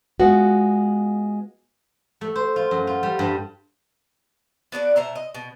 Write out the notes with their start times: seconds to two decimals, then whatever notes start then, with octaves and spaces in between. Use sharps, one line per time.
0.20 G#3 B3 F4 F#4
2.21 A3
2.36 C5
2.56 F4
2.71 F#2
2.87 F4
3.03 G3
3.19 G2
4.72 B3 D4 F#4 D5
4.96 B2 C5 E5 A#5
5.15 D#5
5.35 B2